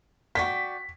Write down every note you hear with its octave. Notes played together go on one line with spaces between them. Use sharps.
F#4 D5 G5 B6